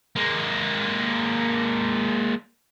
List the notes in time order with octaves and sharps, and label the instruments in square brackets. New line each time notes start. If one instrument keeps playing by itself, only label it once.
[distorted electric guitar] G#3 A#3